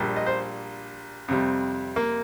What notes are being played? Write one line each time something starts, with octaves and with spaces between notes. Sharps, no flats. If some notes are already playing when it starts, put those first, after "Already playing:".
Already playing: A#1 A#2 G3
D#5
C5
F2 C3 G3
A#3